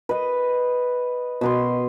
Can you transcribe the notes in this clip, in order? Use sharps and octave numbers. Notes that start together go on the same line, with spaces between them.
B4 D#5
B2 B4 C6